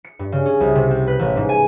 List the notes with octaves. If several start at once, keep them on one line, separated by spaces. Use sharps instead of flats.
C#7
G2
C#3
C#4
C2
C3
C4
B4
A1
G#2
G#5